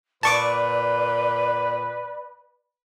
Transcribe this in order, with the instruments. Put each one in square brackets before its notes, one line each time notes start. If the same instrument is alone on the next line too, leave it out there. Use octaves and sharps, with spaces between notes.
[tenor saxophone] A#2 [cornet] B4 [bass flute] D5 [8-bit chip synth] A5 C#6 D6